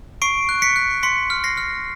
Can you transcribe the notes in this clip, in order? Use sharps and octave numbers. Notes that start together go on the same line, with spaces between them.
C#6 C7 D7
F#6
B6 C#7
F#6
C6 B6 C#7
F6
A#6 C7
F6